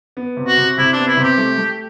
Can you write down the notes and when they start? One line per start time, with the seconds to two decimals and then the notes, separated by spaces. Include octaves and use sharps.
0.17 B3
0.37 C3
0.47 F#4
0.57 C3
0.78 C3 E4
0.93 B3 D4
1.08 E4
1.17 C3
1.23 G4
1.38 A3
1.58 A3